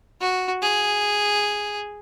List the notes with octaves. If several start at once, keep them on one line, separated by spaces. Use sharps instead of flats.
F#4
G#4